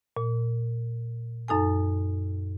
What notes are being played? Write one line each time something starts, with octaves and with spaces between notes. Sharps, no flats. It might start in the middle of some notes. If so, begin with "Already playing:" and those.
A#2
F#2 D#4 A4 G#5